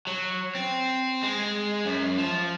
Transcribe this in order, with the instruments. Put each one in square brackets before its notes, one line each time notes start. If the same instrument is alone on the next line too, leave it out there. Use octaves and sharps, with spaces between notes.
[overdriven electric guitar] F#3
C4
G#3
F#2
F3